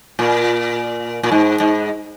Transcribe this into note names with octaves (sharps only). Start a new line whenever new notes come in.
A#2
A#2
G#2
G#2